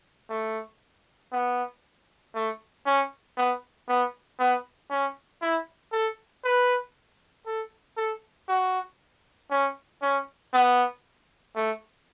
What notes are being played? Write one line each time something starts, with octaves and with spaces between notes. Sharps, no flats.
A3
B3
A3
C#4
B3
B3
B3
C#4
E4
A4
B4
A4
A4
F#4
C#4
C#4
B3
A3